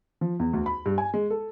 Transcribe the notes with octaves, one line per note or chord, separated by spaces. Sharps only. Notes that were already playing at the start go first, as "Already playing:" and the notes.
F3
E2
D2
B5
G2
G#5
G#3
A4